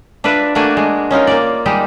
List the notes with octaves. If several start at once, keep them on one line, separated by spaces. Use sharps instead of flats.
D4 F4 B4 D5 E5
A3 A#3 D4 F#4 D5 G#5
G#3
C#4 D#4 F4 A#4
A#3 D5
G3 G#3 D#4 G4